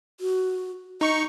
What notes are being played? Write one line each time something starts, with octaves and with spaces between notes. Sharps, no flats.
F#4
D#4 D#5 C#6 C#7